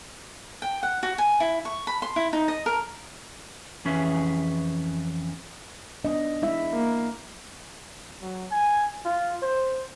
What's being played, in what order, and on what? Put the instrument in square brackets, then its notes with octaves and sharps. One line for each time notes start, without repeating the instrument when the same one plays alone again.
[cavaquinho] G5
F#5
F#4
G#5
E4
C#6
B5
C6
E4
D#4
D#5
A#4
[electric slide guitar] F2 E3 C#4 G#4 B4 E5
[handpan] B3 D4 D#5
G#3 E4 E5
[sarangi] A#3
[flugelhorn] F#3
G#5
F4
C5